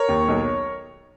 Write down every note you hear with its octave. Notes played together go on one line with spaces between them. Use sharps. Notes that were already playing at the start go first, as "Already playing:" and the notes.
Already playing: A#4 C#5
D#2
B1